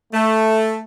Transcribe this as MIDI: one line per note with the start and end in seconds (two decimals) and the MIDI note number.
0.13 0.79 57